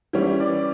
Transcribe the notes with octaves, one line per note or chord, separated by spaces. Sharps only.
E3 G3 C#4
D5